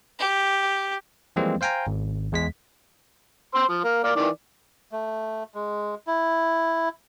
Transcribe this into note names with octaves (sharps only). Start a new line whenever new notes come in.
G4
E3 F3 G3 G#3 A#3 C4
C5 F5 G5 G#5 A#5
G#1
E2 G#3 B6
C5 C6 E6
F3
A#3
A#3 D5
D#3 E3 D5
A3
G#3
E4